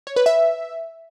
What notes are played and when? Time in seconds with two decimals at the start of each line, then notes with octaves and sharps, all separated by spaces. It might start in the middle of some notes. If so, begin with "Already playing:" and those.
0.07 C#5
0.16 B4
0.26 E5